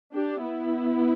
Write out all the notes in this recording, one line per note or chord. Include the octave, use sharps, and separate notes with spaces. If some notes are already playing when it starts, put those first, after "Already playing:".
D4 G4
B3 E4